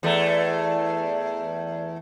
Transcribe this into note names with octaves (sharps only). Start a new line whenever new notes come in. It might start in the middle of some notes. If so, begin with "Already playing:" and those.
E2 A3